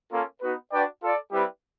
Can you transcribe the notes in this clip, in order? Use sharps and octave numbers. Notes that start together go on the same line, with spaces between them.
A#3 C#4 F4 A4
B3 D#4 F#4 B4
D4 F#4 B4 D5 G5
F4 A4 D5
G3 C4 E4 G4 B4